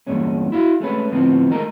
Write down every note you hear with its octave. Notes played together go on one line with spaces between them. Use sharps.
E2 G2 A#2 G#3 C#4
E4 F#4 F5
G#3 A3 C#4 B4
D2 A2 F3 B3 C4
D#3 G#3 A3 D#4 A#4 A#5